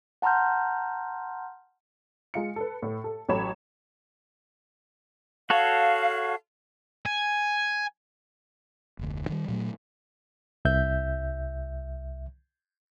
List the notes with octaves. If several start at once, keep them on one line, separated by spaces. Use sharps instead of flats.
F#5 A5 A#5 C6 F6 G6
G#3 F4 C#7
A4 B4
A2
A4
A1 F#3 A4 C#5 B5 E7
F#4 A4 C#5 F5
G#5
F1 D2
D#3 G3
A#2 F#3 G3 A3
C2 E5 G6